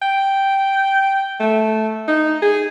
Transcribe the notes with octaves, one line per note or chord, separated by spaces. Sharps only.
G5
A3
D#4
G#4